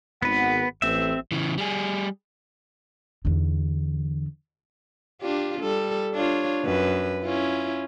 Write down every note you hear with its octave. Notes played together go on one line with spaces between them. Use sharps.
G#1 B3 B4 F#5
A1 C4 E5
C#3 E3
G3 G#4
E2 D3
D4 F4 G4
G3 A4
D4 F4 C#5
F#2 B4
C#4 E4 F4